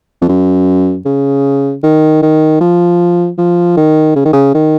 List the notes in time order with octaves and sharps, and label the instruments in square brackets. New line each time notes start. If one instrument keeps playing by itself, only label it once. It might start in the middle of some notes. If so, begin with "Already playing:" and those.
[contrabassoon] F2
F#2
C#3
D#3
D#3
F3
F3
D#3
C#3
D#3
C#3
D#3